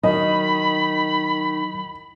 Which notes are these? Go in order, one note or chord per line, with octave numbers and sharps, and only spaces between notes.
D#3 F#3 D#5 B5